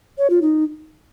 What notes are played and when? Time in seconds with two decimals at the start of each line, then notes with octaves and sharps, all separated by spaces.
0.18 C#5
0.30 F4
0.42 D#4